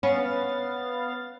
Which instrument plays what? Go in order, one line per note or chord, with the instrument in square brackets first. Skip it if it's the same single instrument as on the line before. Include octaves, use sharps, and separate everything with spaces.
[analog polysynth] B3 F5 A6 [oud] C#4